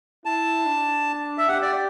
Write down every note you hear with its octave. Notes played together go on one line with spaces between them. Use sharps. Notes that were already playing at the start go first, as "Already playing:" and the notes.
E4 A5
D4
E5
G4 F#5
D5